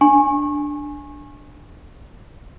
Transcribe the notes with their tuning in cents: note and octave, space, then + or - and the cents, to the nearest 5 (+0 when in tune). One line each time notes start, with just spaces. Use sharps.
D4 +0 G#5 +0 C#6 -30